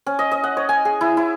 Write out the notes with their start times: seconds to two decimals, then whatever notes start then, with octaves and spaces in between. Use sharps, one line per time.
0.06 C#4
0.19 D#5
0.32 D#5
0.44 F#5
0.57 C#5
0.69 G#5
0.85 G#4
1.01 E4
1.17 E4